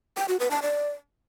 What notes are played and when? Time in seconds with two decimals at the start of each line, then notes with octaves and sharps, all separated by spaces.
0.17 G5
0.28 F#4
0.40 B4
0.51 A5
0.62 D5